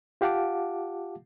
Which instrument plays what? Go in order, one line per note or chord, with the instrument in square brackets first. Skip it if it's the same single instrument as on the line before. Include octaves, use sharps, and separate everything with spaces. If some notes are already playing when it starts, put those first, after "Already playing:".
[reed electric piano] F4 G4 F5 F#5 A5 D6